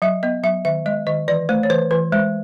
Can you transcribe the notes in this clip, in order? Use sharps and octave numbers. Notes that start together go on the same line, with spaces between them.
F#3 E5
B3 D#5
F#3 E5
D#3 E5
G#3 D#5
D#3 D#5
E3 D5
A3 C5
C#5
E3 C5
E3 B4
G#3 C5